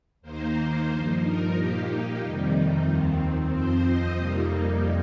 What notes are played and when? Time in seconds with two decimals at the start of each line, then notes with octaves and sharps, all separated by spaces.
0.21 D#2 D#3 A#3 D#4 C5
0.87 G2 F3 D#4 C5
1.20 A#4
1.52 A#2 A#3 D#4 G4
2.19 F2 C3 D#3 G3 D#4
2.83 D#2 D#3 C4 F4
3.50 F2 F3 C4 C5
3.82 D#5
4.15 F2 C3 G3 A#3 D#4